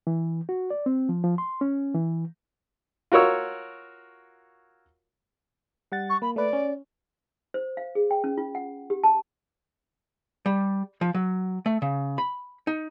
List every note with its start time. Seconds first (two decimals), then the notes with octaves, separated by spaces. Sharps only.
0.07 E3
0.49 F#4
0.70 D5
0.86 C4
1.09 F3
1.24 F3
1.38 C6
1.61 C#4
1.95 E3
3.12 F4 F#4 A#4 C#5 E6
5.92 G3 F#5 A6
6.09 C#6
6.22 A#3 B5
6.36 A3 B4 D5
6.53 C#4
7.54 C5
7.77 F5
7.95 G#4
8.11 G5
8.24 C#4
8.38 F4
8.55 F#5
8.90 G4
9.04 A5
10.46 G3
11.01 F3
11.14 F#3
11.66 A3
11.82 C#3
12.18 B5
12.67 D#4